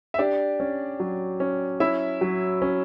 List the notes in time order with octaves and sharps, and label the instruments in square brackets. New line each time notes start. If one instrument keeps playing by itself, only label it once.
[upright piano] E5
[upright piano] D4 D5 [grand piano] G4
[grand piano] C#4
F#3
C#4
[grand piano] C#4 [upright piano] E4 E5
[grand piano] F#3
C#4